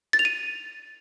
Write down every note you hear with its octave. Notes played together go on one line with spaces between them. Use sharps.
A6
F7
D#7